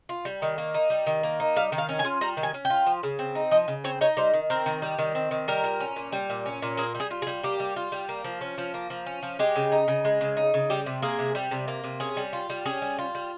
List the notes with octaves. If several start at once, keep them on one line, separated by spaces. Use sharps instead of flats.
F4
G3
D#3
A#3
D#4
G3
D#3
A#3
D#4
G3 F5
D#3
F5
C#4
G#5
F4
G3 A#5
D#3
G#5
C#4
G5
F4
F3
C#3
C4
D#4
F3 D#5
C#3
C4 C#5
D#4 C#5
G3 C5
D#3
C4 A#4
D#3
G3
D#3
C4
D#3
G3 A#4
A#2
C#4
A#2
G3
A#2
C#4
A#2
A#3 G#4
G3
G#4
F4
G#4
G3
A#3 G4
G3
F4
G3
A#3
F3
C#4
F3
A#3
F3
C#4
F3
G#3 G4
C#3
D#4
C#3
G#3
C#3
D#4
C#3
G3 G4
C3
A#3 G#4
C3
G3
C3
A#3
C3
C#4 G#4
G3
F4
G3
C#4 G#4
G3
F4
G3